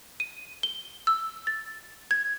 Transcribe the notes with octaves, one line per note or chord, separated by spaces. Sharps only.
D#7
G7
E6
A6
G#6